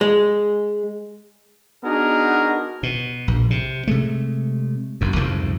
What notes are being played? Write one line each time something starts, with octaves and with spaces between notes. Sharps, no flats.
G#3
B3 D4 D#4 F#4 G#4 A#4
B2
A#1
C3
C3 G#3 A3
F#1 F#2
C2 F2 G#2 C#3